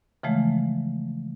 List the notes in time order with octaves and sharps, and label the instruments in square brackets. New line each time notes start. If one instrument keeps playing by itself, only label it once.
[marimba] C#3 E3 F3 G#3 A3